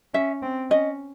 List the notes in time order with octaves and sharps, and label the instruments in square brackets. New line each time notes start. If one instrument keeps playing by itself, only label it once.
[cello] C#4 [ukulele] E5
[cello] C4
[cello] C#4 [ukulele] D#5